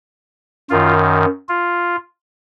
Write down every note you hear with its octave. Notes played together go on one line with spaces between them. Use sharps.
F#2 D#3 F4
F4